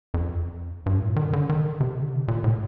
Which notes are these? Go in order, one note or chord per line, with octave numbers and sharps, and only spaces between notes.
F2
G2
A2
A#2
D#3
D3
D3
D#3
C3
D3
C3
A#2
A2